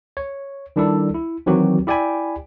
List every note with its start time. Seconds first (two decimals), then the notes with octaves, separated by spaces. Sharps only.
0.17 C#5
0.76 D#3 G3 D4 E4 A4
1.14 E4
1.46 D#3 E3 F#3 C4 F#4 G4
1.87 E4 G4 D5 G5 G#5 B5